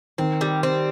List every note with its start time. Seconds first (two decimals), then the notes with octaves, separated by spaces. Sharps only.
0.18 D#3 C4
0.41 G3
0.63 C4